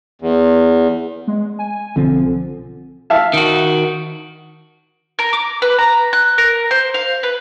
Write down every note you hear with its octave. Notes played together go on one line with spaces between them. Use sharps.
E2
G#3
G#5
B1 D3 F3 C4
E5 F5 A5
D#3 F#4
A#4
D6
B4
A#5
F#6
A#4
C5
F5
B4